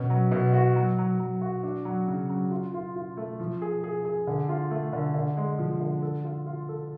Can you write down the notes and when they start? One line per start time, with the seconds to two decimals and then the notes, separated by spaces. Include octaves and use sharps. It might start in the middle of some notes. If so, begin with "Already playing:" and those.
Already playing: B2 C#4
0.10 F#3
0.31 B2
0.53 F#4
0.76 F#3
0.98 F#3
1.20 F#3
1.41 F#4
1.63 D4
1.85 F#3
2.08 C#3
2.29 F#3
2.51 F4
2.74 F4
2.96 F4
3.17 A3
3.40 F3
3.62 G#4
3.84 G#4
4.05 G#4
4.27 D3
4.49 F4
4.71 A3
4.93 D3
5.15 D3
5.37 G#3
5.58 F3
5.81 D3
6.02 A4
6.24 F4
6.46 F4
6.69 A4